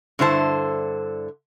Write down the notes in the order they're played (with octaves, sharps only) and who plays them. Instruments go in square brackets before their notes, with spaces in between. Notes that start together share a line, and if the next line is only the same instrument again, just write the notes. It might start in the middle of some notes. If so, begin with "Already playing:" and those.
[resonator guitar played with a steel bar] G2 D3 E4 C5 A5